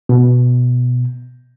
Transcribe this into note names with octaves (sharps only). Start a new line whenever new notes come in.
B2